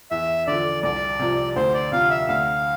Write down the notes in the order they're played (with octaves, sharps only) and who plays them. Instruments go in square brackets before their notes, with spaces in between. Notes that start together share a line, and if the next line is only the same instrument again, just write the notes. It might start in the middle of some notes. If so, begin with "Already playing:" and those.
[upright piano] E2 [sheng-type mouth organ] E5
[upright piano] D3 F3 [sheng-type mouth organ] D5
[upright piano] C2 [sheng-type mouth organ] D5
[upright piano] C3 F3
[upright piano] D2 [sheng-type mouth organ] C5
[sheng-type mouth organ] D5
[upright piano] C3 F3 [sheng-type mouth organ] F5
[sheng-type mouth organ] E5
[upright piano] D2 [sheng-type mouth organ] F5